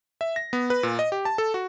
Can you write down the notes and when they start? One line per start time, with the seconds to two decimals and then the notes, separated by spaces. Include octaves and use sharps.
0.21 E5
0.36 A#6
0.53 B3
0.70 B4
0.83 A#2
0.99 D#5
1.12 G4
1.25 A5
1.38 A4
1.54 F#4